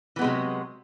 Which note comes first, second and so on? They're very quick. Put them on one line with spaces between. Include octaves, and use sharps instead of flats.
E3 B3 G#3 C3 F#3